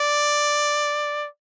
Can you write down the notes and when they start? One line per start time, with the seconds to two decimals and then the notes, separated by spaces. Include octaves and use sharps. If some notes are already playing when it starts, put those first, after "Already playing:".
Already playing: D5